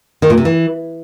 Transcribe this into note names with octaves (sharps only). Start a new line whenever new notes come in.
D#3
A#2
C3
E3